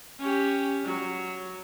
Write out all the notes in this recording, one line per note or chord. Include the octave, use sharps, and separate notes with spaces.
C#4 G4
F#3